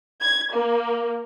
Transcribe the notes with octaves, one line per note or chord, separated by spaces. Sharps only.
G#6
A#3